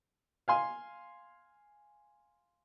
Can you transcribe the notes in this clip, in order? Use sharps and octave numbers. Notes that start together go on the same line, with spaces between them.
F5 G#5 C6